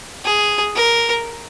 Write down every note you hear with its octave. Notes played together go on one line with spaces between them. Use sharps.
G#4
A#4